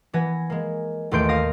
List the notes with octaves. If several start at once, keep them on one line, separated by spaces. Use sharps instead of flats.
E3 B3 G#5 A#6
G#3 A#3
A1 D#2 A3 C6 G6 D7
F5 D#6 A#6